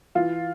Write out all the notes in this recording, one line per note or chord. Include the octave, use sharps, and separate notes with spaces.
E3 F4